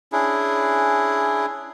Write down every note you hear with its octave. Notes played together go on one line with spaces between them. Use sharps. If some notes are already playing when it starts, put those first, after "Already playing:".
C#4 D4 E4 G#4